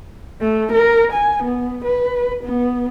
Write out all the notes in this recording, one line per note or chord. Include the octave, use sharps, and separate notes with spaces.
A3
A#4
G#5
B3
B4
B3